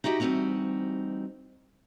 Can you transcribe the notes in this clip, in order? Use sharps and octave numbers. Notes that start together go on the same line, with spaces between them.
D#4 E4 F#4 G4 D#5
D2 E3 G3 C4 D#4 F#4